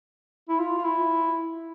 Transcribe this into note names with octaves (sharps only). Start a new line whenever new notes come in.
E4
F4
F4
E4